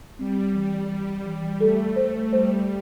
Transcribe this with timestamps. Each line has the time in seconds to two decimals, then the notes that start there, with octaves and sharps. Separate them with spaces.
0.19 G3 C4
0.55 E3
0.90 E3
1.26 E3
1.60 A3 A4
1.96 C5
2.32 G3 C5